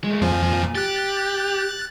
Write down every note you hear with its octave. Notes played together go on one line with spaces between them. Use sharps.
G#3 A3
F2 A#2 F3 G#5
G4 F#6 A6